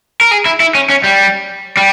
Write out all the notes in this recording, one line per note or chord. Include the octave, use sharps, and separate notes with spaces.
A#4
G#4
E4
E4
C#4
C#4
G3
G3